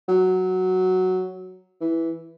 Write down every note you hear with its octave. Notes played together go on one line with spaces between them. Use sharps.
F#3
E3